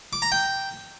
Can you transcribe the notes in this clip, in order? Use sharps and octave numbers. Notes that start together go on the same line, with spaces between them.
D6
A#5
G5